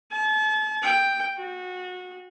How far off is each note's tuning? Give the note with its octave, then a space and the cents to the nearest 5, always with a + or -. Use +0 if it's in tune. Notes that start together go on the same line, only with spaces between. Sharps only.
A5 -40
G5 +5
F#4 -25